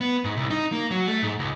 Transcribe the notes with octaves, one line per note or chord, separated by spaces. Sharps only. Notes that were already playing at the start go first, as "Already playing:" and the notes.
B3
G#2
C2
D#4
A#3
F#3
A3
G#2
C#2